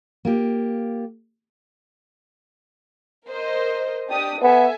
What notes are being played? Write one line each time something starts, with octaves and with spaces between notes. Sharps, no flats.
A#3 F4 G4
A#4 C5 D#5
D4 G4 D#6
B3 A4 E5 G#5